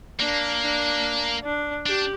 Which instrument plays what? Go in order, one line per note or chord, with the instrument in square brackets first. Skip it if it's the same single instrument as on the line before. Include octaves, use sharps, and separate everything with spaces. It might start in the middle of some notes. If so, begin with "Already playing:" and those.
[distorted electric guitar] A#3 [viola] D4
[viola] D4
D4
[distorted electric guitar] D4 [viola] G4